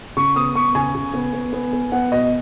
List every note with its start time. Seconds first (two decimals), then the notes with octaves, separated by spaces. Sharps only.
0.17 C#3 C#6
0.36 B3 D#6
0.55 B3 C#6
0.75 C#3 G#5
0.95 C#3
1.14 B3
1.33 B3
1.53 B3
1.73 B3
1.92 B3 F#5
2.12 B2 D#5